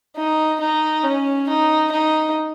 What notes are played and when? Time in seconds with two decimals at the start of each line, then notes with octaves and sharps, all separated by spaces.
0.16 D#4
0.61 D#4
1.04 C#4
1.48 D#4
1.92 D#4